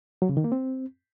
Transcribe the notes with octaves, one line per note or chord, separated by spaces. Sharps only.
F#3
C#3
D#3
A#3
C4